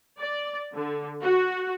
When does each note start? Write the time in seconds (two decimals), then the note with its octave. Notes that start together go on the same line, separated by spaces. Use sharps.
0.19 D5
0.74 D3
1.21 F#4